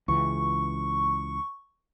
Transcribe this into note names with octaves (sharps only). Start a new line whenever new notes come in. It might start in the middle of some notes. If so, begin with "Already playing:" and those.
C#2 E3 C#6